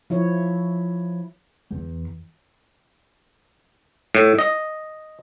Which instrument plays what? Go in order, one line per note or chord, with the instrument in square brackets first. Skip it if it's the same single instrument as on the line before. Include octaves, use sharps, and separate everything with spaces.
[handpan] F3 E4 C#5
[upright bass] E2
[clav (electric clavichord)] A2
D#5